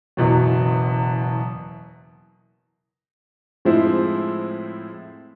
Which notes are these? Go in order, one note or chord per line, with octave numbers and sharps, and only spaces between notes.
F#1 E2 B2 F#3
A2 F3 G#3 C4 E4